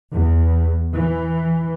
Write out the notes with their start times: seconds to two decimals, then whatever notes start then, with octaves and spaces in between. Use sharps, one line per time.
0.12 E2
0.93 E3